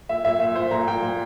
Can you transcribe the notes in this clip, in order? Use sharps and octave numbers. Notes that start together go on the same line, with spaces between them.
A#2 E5
A#2 E5
A#2 E5
A#2 C5
A#2 A#5
A#2 G5
A#2